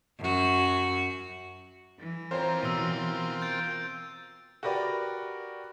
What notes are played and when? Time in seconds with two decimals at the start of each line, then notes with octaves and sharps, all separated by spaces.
0.20 F#2 F#4
1.99 E3
2.31 C4 F4 A#4 C5 C#5 A#5
2.63 B2 E6 D#7
3.42 G6 A6 D7
4.63 F#4 G4 A#4 B4 D5